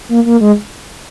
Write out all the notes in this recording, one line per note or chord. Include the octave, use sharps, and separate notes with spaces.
A#3
A#3
G#3